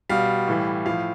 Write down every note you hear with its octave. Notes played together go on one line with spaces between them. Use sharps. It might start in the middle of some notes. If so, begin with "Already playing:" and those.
B2 G3 F5
A2 E3 G3
A2 F3 F5